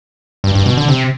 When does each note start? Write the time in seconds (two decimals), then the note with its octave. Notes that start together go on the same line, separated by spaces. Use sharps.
0.44 G2
0.55 G2
0.66 B2
0.77 D3
0.88 C3